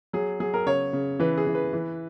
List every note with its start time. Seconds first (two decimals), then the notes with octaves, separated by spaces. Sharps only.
0.13 F#3 G#4
0.40 F#3 G#4
0.54 A#4
0.66 C#3 C#5
0.93 C#3
1.20 E3 B4
1.38 G#4
1.47 E3
1.55 B4
1.73 E3